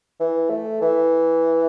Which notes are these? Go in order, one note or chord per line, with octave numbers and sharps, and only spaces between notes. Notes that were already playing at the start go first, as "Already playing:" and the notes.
E3
A3
E3